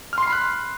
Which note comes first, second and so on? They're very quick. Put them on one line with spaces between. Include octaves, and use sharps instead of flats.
F6 C6 C7 B5 F#6